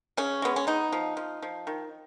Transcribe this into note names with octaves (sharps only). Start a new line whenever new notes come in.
C#3 C#4
G#3 B3
C#4
B3 D#4
F3
F3
F3
D#3